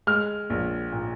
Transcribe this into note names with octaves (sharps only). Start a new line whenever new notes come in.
G#3 F6
A#1
A#2